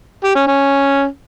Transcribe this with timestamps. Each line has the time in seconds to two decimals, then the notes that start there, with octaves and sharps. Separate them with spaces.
0.24 G4
0.35 C#4
0.47 C#4